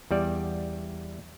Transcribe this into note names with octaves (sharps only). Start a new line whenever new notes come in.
E2 G3 D5